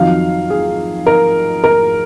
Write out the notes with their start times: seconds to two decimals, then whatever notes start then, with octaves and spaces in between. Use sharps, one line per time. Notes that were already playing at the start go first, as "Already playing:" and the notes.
Already playing: F2 D#3 F#3 F5
0.50 G#4
1.06 A#4
1.64 A#4